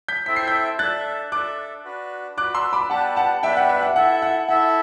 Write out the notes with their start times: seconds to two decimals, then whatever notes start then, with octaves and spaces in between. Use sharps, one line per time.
0.08 G6 B6
0.26 C4 E4 A4 E5 G5 B6
0.36 C7
0.47 G6 B6
0.79 D4 A4 E5 F#6 A6
1.32 D4 A4 E5 D6 F#6
1.85 D4 F#4 B4
2.37 D4 F#4 B4 D6 F#6
2.54 C6 E6
2.73 B5 D6
2.90 B3 D4 G4 B4 F#5 A5
3.16 F#5 A5
3.43 B3 D4 G4 B4 E5 G5
3.57 F#5
3.69 E5
3.82 F#5
3.95 E4 A4 E5 F#5
4.22 F#5
4.48 E4 A4 E5 F#5